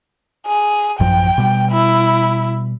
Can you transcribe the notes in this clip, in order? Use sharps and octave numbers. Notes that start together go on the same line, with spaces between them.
G#4
A1 F#2 F3 G5
B2 G3
E4